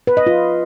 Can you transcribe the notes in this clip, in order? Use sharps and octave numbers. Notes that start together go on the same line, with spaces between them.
B4
D#5
F4